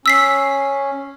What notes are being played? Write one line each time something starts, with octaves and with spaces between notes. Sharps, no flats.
C#4 E6 B6 C7